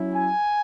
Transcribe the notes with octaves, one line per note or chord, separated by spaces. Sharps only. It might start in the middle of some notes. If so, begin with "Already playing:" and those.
Already playing: F#3 C#4 E4
G#5